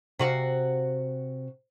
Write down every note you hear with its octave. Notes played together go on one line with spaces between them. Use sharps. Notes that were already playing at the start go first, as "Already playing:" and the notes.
C3 F#4 F5